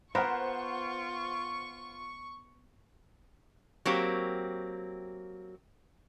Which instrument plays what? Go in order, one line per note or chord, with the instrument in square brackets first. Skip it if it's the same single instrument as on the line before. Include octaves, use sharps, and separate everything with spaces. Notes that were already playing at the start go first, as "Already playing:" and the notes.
[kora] B3 A#4 [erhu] F4 [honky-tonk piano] C5 F#5 [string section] C#6
[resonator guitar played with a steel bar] F#3 A#3 C4 G4